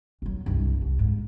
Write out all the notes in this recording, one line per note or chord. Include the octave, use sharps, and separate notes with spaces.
B1 F#3
C2 G2
C2
G#2